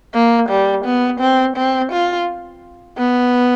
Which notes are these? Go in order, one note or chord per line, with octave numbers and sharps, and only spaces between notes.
A#3
G3
B3
C4
C4
F4
B3